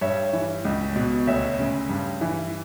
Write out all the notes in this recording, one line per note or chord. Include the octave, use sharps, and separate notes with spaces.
G2 C#5 E5
E3
C#2
B2
D2 C#5 E5
C#3
G2
E3